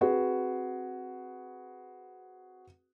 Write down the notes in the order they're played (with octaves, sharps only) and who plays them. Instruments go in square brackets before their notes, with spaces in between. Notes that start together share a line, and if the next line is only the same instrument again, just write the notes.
[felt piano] C4 F#4 G#4 B4